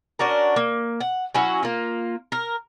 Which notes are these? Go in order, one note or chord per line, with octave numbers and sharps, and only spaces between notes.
C#4 D4 F#4 A#4
A#3
F#5
F#3 C#4 E4 F#4
A#3 F4
A#4